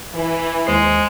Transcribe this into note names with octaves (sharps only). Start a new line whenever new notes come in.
E3
D#2 G#3 C5 C7